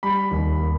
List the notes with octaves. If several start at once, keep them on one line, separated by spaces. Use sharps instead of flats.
G3 B5
D#2
A#3